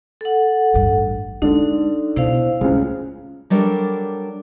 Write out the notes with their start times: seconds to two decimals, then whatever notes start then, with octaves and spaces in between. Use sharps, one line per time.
0.21 A4 F#5
0.74 A1 G2
1.42 D3 G#3 D4 D#4
2.16 B2 E4 C5 F5
2.61 C#2 A2 C#3
3.50 F#3 G3 D4 A4 A#4